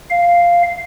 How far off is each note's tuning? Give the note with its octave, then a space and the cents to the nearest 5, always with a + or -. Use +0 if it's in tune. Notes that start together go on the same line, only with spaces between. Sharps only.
F5 -5